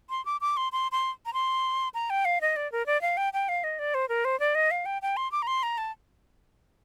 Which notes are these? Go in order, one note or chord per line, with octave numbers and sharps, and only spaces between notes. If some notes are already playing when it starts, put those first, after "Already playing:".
C6
D6
D6
C6
C6
C6
A#5
C6
A#5
G5
F5
D#5
D5
A#4
D5
F5
G5
G5
F5
D#5
D5
C5
A#4
C5
D5
D#5
F5
G5
G5
C6
D6
A#5
C6
A#5
A5